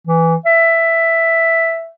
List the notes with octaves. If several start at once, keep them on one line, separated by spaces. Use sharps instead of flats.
E3
E5